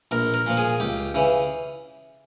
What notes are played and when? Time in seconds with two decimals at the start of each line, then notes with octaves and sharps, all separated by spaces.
0.11 A#1 A#4
0.34 A#4
0.47 A#2 F3
0.57 G#4
0.80 C#2 G4
1.14 C#3 E3